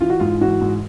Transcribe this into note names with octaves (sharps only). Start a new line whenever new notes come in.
E3 F4
F#4
G#2 F4
E3 F#4
G#2